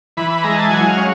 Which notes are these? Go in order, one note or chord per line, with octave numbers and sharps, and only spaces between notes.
E3 B5
B5
G#3 A#5
A5
F#3 G#5
F5
C#4